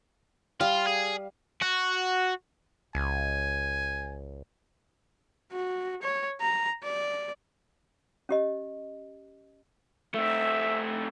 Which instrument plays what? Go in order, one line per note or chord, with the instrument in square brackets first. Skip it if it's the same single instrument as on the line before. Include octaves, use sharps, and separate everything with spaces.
[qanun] G3 [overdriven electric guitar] F4 [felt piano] F5
[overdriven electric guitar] G#4
F#4
[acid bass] C#2 [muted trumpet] G#5
[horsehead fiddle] F#4
C#5
A#5
D5
[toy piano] C#4 G4 D#5
[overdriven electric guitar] A3 C4 [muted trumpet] E5